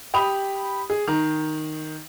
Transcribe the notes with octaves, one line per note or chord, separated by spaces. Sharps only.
G4 B5 D#6 F7
G#4
D#3 A#5